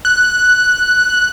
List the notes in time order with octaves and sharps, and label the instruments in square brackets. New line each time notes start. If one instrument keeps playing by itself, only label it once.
[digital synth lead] F#6